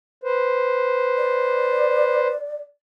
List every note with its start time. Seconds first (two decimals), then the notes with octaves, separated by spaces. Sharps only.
0.24 B4 C5
1.17 D5